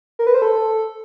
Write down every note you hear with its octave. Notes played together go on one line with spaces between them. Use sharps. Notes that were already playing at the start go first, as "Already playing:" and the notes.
A#4
B4
C5
A4